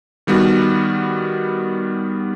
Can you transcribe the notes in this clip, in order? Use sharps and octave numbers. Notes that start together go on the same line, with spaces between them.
D#3 G3 B3 F#4